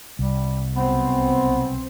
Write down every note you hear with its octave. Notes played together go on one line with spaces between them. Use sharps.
C2 G3
B1 B2 B3 C4